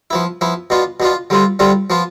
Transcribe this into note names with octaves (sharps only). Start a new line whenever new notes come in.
F3 B3 E4
F3 B3 E4
B2 B3 D4 F4
B2 B3 D4 F4
D3 G3 C4 F4
D3 G3 C4 F4
F3 B3 F4